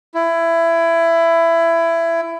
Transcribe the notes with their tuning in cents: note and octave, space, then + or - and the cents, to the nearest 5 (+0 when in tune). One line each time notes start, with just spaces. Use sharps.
E4 +20